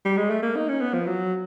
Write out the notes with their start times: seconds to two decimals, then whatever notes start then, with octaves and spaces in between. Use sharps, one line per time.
0.05 G3
0.17 G#3
0.30 A3
0.43 A#3
0.56 D#4
0.68 C#4
0.81 B3
0.93 F3
1.06 F#3